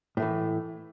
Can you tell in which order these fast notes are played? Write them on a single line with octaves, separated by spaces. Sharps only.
A2 A3 E3